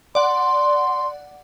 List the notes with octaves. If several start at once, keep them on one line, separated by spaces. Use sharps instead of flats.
D5 F#5 C6